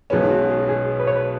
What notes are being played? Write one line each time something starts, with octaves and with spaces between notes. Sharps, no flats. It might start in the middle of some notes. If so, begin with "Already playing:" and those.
B1 B2 G#3 C#4 B4
D#4
F#4
G#4
F#4
G#4
B4
C#5
B4